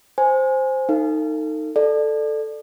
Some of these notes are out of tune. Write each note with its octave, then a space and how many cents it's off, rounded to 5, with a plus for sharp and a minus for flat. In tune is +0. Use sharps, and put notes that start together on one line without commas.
C5 +0 G#5 +0
D#4 +0 A4 +35 F5 -35
A4 +0 D5 +20